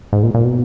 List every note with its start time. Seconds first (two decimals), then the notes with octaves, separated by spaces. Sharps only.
0.13 G#2
0.23 A#2
0.35 A#2
0.45 B2